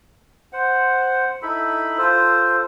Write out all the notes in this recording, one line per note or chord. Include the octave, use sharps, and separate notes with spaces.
C5 F#5
D#4 E4 A4 B5
F4 A4 C5